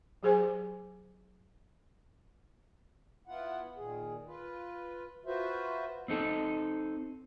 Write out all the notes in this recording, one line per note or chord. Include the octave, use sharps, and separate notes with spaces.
F#3 G4 G#4 C5 G#5 D6
B3 E4 F4 F#5
A#2 D#3 G#4
F4 B4
F4 F#4 B4 C5 E5
C4 D#4 A4